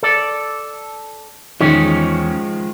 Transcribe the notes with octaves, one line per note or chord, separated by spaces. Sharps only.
A4 D5
E2 G2 D#3 F3 G#3 C#4